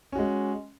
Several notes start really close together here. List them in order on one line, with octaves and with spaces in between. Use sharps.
C#4 F#4 G#3